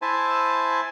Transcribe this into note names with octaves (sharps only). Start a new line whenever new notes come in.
E4 C5 E5 G#5 A5